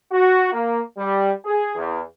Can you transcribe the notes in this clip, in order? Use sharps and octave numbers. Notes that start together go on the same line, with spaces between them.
F#4
A#3
G3
G#4
E2